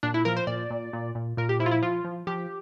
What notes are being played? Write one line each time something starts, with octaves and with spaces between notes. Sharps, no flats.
A#2 D4
E4
F3 A#4
C5
A#2 D5
A#2
A#2
A#2
A#2 A#4
G4
F3 E4
F4
E4
F3 F4
F3
F3 G4